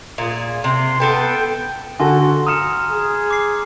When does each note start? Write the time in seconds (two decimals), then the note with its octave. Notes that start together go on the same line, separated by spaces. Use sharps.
0.18 A#2 G#4
0.64 C3 C6
1.00 B3 A4 B4 G5
2.00 D3 F#4 A4 G#5 C6
2.47 A#5 D#6 F6 C#7 E7
2.91 G#4
3.31 D6 C7